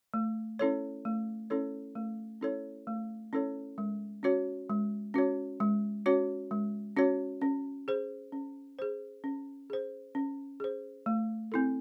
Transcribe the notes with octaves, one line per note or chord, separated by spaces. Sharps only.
A3
C#4 E4 A4 C#5
A3
C#4 E4 A4 C#5
A3
C#4 E4 A4 C#5
A3
C#4 E4 A4 C#5
G#3
C#4 F#4 C#5
G#3
C#4 F#4 C#5
G#3
C#4 F#4 C#5
G#3
C#4 F#4 C#5
C#4
G#4 C5
C#4
G#4 C5
C#4
G#4 C5
C#4
G#4 C5
A3
C4 E4 A4